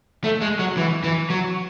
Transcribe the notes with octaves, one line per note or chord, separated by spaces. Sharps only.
A3
G#3
F#3
E3
E3
F#3